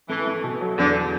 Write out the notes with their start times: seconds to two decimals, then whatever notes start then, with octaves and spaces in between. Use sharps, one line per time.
0.09 E3 A3
0.27 A3
0.44 B2
0.61 F#3
0.78 E2 D3